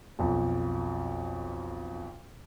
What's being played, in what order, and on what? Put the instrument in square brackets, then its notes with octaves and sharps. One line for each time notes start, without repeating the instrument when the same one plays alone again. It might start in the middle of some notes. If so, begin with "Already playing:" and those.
[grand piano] B1 F2